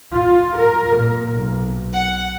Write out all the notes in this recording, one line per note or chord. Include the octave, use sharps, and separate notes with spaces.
F4
A#4
A#2
B1
F#5